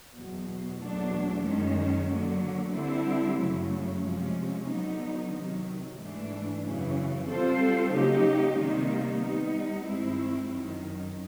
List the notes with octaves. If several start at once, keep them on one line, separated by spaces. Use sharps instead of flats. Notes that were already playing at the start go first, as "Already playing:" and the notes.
E2 B2 F#3
E2 B2 F#3 A3 D4
F#2 D#3 G#3 C#4
D3 F#3 A#3
D3 G3 C4 E4
F#2 C#3 F#3 A3
C3 F3 G#3 C#4
D3 F#3 B3 D#4
C3 D#3 F#3
G#2 E3 A3 D4
F#2 C#3 E3
G3 C4 F4 A4 C5
C#3 F#3 A#3 D#4 G4
C3 D#3 G3 A#3 D#4
G3 B3 D#4
G2 D#3 G#3 C4 E4
F#2 D#3 F#3